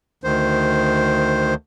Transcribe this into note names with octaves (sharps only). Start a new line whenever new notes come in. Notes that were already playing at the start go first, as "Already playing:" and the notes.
D2 D#3 C5